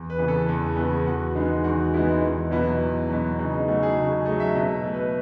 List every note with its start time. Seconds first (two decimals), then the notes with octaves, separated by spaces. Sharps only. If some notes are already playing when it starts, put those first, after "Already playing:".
Already playing: E2
0.10 B4
0.19 C#3 E3 B3
0.28 A4
0.48 E2
0.77 C#3 E3 B3
1.06 E2 F#4
1.35 D#3 G#3 B3 D#4
1.64 E2 F#4
1.94 D#3 G#3 B3 E4
2.22 E2 D#4
2.51 B2 F#3 B3 E4
2.80 E2
3.09 B2 F#3 B3
3.39 C#3 D#4
3.53 D#4
3.68 F#3 A3 F#4
3.83 G#4
3.97 C#3
4.04 F#4
4.12 G#4
4.25 A3 D#5
4.31 F#3
4.40 E5
4.55 B2 D#5
4.84 A3
4.94 B4